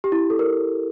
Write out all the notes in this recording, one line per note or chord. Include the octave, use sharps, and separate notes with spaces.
G4
E4
A4
A#4